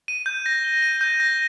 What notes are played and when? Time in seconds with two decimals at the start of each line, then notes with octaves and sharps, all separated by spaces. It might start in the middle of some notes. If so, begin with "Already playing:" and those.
0.08 D#7
0.26 G6
0.46 A#6
0.64 G7
0.82 D#7
1.01 G6
1.20 A#6